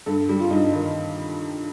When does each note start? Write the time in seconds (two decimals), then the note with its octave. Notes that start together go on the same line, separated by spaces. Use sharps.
0.06 G2 A4
0.29 G3
0.40 F4
0.50 G2 D#4
0.72 D#3 D#4